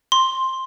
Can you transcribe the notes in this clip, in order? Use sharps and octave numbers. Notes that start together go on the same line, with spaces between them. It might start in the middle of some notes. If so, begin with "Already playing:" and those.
C6